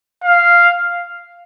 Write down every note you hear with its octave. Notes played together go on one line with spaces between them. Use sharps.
F5